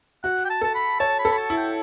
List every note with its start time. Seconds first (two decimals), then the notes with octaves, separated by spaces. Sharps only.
0.24 F#4 F#5
0.45 G5
0.50 A5
0.61 A4 A5
0.75 B5
1.00 C#5 A5
1.19 B5
1.25 A4
1.32 B5
1.38 A5
1.50 E4
1.57 G5